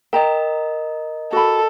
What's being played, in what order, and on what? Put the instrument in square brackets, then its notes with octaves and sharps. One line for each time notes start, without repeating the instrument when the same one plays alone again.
[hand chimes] A#4 D#5 [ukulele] G5 A#5
[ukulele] F#4 B5 [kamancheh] A4